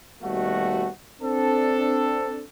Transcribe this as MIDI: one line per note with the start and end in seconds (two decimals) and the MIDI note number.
0.22 0.89 39
0.22 0.89 47
0.22 0.89 55
0.22 0.89 57
0.22 0.89 66
1.21 2.44 60
1.21 2.44 62
1.21 2.44 69